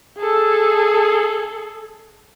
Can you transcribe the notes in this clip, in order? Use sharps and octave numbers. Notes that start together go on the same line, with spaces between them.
G#4 A4